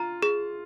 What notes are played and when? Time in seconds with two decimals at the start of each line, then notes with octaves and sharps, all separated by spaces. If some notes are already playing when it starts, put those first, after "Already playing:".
Already playing: F4 A#5
0.23 G#4